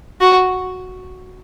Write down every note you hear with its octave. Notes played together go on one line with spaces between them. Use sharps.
F#4